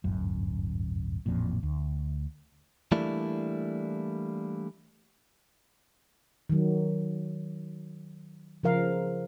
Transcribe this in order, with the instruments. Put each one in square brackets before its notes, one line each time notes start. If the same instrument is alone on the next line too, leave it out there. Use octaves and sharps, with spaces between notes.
[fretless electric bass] D1 G1 F#2
A1 F2 A#2
D2
[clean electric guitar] E3 G3 A3 A#3 D4 E4
[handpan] D#3 F#3
C#3 F3 A#4 F5